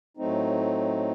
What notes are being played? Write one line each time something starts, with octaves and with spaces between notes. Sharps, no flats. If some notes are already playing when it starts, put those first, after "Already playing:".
A2 F#3 A3 C4 D#4